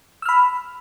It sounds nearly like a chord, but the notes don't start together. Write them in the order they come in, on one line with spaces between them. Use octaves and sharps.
E6 F6 B5